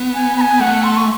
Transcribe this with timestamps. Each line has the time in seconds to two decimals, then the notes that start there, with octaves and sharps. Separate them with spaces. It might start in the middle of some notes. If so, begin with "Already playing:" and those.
Already playing: B3
0.14 G#5
0.37 B5
0.41 G#5
0.60 A3 F#5
0.83 C6
0.97 C#6